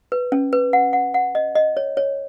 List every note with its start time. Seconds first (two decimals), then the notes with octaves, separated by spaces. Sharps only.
0.12 B4
0.32 C#4
0.53 B4
0.73 F#5
0.93 F#5
1.14 F#5
1.35 D#5
1.55 D#5
1.77 C#5
1.97 C#5